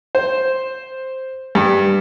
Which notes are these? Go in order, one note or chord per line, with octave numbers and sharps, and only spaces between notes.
C5
G2